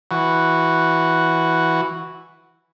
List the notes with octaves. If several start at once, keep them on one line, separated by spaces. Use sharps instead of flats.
E3 F#4